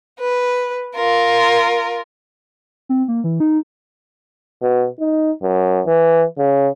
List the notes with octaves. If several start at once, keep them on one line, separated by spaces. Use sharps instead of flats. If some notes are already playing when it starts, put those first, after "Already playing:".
B4
F4 A#4
C4
A#3
E3
D#4
B2
D#4
F#2
E3
C#3